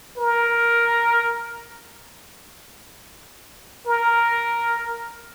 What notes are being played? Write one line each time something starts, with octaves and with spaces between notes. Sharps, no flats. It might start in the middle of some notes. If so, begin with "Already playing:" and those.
A#4
A#4